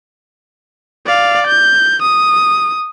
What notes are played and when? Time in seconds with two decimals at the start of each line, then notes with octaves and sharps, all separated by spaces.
1.06 D5 F5
1.47 G6
2.02 D#6